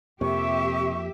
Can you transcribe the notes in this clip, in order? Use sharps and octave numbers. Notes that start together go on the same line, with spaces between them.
F2 C3 F3 A#3 G4 E5 C#6